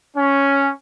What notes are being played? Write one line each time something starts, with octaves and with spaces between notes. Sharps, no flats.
C#4